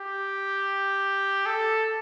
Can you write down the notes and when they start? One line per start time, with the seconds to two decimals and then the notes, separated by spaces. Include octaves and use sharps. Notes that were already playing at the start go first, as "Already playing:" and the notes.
Already playing: G4
1.46 A4